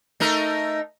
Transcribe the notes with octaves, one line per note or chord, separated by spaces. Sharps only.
A3 D#4 A#4